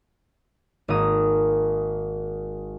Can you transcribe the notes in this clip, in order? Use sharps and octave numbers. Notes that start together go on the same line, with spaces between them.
G#1 A#3 A#5 D#6